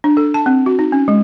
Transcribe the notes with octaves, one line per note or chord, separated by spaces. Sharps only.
D4
A4
A5
C4
F#4
D#4
C#4
G#3